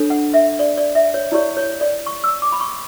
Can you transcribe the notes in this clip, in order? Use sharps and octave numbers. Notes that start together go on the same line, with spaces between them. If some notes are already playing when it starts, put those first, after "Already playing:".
Already playing: D4 A4 C#5
F#5
E5
D5
D5
E5
C#5
E4 G4 C#5 D5
C#5
D5
C#6
E6
D6
B5
C#6